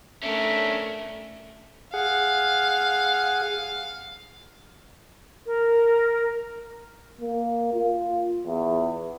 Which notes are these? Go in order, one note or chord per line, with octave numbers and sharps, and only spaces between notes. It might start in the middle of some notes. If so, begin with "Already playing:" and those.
A3 C#4 D4 A#4 E5
G#4 F5 F#5
A#4
A#3
F4
E2